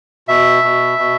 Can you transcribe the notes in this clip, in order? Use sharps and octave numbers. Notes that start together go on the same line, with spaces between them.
B2 E5
B2
B2